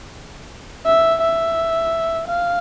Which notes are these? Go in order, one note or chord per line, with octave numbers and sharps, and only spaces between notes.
E5
E5
F5